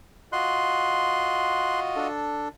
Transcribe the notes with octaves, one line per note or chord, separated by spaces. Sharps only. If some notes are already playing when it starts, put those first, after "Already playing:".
F4 F#4 D#5 C6 F#6
D4 A4